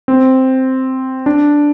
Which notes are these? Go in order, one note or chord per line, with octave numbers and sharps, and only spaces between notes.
C4
D4